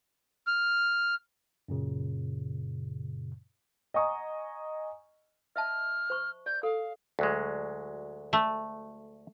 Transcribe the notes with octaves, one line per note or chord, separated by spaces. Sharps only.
F6
F#2 A#2 C#3
D#5 F#5 G#5 A#5 C#6 D#6
D#5 E5 A5 F6
C5 C#6
D5 G6
A4 F5
D2 F#3 G#3
A3